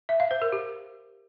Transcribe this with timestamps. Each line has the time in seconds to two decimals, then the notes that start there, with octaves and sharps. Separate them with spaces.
0.09 E5
0.20 F5
0.31 C5
0.42 A#4
0.52 G4